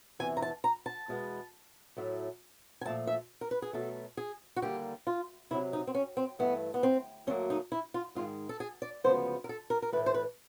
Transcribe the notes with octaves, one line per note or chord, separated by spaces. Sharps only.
E2 C3 E3 G#5
A#5
A5
A#5
A5
E2 B2 G#3 B3
A2 F#3 A3
G#5
A#2 F3 A3 A5
E5
A#4
B4
G#4
B2 F#3 A3 A4
G#4
F#4
D#2 D3 G3 A#3 G4
F4
C3 D#3 F#3 E4
D#4
C4
C#4
C4
G2 E3 A3 B3
B3
C4
D2 D3 F#3 A#3 C#4
D#4
E4
F4
G#2 D#3 G#3 F4
A4
G#4
D5
D2 C#3 F3 G#3 B3 C5
A#4
A4
A#4
A#4
A2 E3 A3 B4
C5
B4